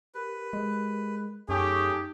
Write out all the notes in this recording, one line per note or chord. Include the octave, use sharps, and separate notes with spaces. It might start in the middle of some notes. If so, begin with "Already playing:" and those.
G4 A#4 B4
G#3
F#2 A3 C#4 D#4 G4 G#4